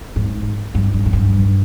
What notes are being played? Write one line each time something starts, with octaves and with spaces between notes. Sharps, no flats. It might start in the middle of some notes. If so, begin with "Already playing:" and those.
G#2
G2
G2
G#2
G2